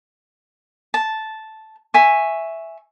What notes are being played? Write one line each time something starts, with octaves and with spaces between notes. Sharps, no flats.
A5
E5 G#5 C#6